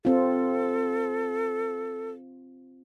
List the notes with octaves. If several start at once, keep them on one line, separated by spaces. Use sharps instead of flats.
C4 F4 A4